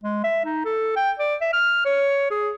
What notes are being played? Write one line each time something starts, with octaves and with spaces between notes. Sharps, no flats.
G#3
E5
D#4
A4
G5
D5
E5
F6
C#5
G#4